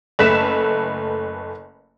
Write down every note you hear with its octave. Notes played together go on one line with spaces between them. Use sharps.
F#1 A3 B4 B6 E7